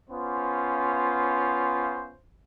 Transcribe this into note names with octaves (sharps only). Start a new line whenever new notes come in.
B3 C#4 F4 C5